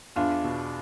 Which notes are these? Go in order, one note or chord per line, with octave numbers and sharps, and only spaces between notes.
E2 D4 F4
B2